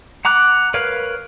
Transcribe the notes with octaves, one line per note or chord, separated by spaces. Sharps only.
F#5 A#5 D6 F#6
A#4 B4 C#5 F5